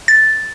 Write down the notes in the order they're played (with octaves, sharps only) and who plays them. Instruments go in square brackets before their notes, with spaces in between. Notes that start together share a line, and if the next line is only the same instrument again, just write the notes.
[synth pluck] A6